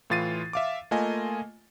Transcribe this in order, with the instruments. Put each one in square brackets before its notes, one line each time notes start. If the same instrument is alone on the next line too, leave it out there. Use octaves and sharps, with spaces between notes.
[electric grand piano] A2 E3 F4 A6 C7 D#7
E5 F5 D6
A3 A#3 F4 D#5 G#5